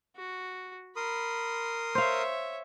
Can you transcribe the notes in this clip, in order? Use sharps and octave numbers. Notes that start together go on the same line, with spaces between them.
F#4
A#4 B5 C6 D#6
C5 C#5 E5 F5